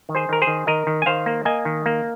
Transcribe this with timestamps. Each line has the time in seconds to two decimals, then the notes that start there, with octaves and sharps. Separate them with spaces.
0.09 D#3
0.15 G#4 C5
0.29 D#3 A#4
0.42 G#4 C5
0.47 D#3
0.67 D#3 A#4 D#5
0.87 D#3
1.02 G#5
1.06 D#3 C5 F5
1.26 A#3
1.45 A#3 D#5 G#5
1.65 D#3
1.86 A#3